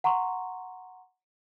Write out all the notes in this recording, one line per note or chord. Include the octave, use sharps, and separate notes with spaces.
F#5 A#5 C6 C#6